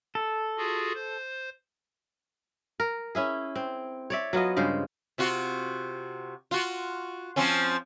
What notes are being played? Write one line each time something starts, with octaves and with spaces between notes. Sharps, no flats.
A4
F4 F#4 G#4
C5
A#4
C#4 E4 G#4
C4
C#5 D5 E5
F#3 B3 F4 D#5
G2 C#3 G#3 C5
C3 F4 F#4
F4 F#4
F3 C4 C#4